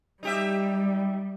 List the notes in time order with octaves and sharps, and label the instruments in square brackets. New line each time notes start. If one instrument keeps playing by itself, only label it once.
[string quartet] G3 [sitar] D#4 G4 E5